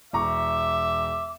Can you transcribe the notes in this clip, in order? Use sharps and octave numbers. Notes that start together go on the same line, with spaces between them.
E1 E5 A#5 C#6 D6